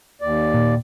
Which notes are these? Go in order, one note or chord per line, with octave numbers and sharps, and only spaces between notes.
D#2 D5
A#2